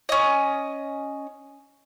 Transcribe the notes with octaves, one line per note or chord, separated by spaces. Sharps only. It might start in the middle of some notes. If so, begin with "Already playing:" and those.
C#4 D#5